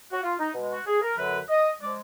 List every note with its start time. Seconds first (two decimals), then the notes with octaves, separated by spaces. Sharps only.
0.12 F#4
0.23 F4
0.39 D#4
0.54 B2 G#3
0.71 F#4
0.87 G#4
1.02 A#4
1.17 F#2 D3 F#3 B4
1.49 D#5
1.80 F3 G#3 D5